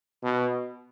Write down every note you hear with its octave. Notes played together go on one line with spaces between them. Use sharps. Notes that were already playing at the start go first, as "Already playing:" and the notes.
B2